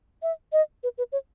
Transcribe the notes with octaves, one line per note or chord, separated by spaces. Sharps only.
E5
D#5
B4
B4
C#5